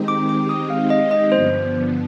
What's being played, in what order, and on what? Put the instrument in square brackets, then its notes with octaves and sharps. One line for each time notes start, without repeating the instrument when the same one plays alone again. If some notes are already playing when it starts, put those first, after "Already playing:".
Already playing: [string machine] D#3 G#3 C4 D#4 G4
[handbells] D6
D6
D#6
F5
D#5
D#5
[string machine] G2 D3 F3 B3 [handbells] C5